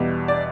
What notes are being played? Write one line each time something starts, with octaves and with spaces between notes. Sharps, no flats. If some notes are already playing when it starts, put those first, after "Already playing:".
Already playing: E2 B2 G3
D5